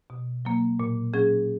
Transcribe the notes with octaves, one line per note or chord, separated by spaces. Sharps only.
B2
F#3 A#3
A#2
F#3 C#4 G#4